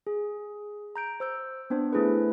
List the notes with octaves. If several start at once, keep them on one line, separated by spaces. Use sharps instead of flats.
G#4
A#5 G6 D7
C5 E6 G6
B3 C4 D4 C5
A3 E4 G#4 A4 B4